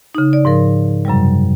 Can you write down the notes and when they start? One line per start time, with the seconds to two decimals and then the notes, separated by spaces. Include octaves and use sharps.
0.15 C#3 D#4
0.33 D5
0.45 G#2 F3 A#4
1.05 F#2 C3 F#3 G3